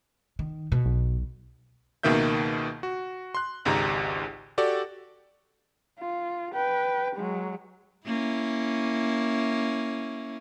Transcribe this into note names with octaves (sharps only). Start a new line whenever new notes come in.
D#3
B2
B1
C#2 B2 D#3 A#3 E5 G6
F#4
C6 F#6
G#1 C#2 G#2 G4 A#5
F#4 G4 A4 D5
F4
B4 G5
F#3 G#3
A#3 C#4 E4